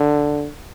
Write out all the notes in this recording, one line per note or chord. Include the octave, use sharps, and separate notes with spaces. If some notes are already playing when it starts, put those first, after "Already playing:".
Already playing: D3